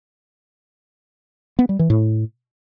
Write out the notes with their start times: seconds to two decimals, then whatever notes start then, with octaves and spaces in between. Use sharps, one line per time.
1.59 B3
1.69 G3
1.79 E3
1.90 A2